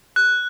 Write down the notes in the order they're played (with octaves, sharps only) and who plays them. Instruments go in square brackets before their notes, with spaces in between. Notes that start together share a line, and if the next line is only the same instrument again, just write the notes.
[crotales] F#6